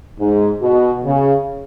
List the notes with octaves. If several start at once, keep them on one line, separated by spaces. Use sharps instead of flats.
G#2
B2
C#3